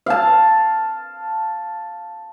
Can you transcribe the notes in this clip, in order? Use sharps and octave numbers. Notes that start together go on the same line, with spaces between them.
F5 A5